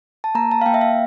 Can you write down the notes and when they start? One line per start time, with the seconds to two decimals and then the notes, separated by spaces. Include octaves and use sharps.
0.24 A5
0.35 A#3 A#5
0.51 A5
0.61 F5
0.66 A#3 G5
0.74 E5
0.81 F5